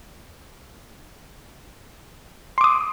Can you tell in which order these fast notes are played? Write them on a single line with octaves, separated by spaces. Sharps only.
C6 D6 D#6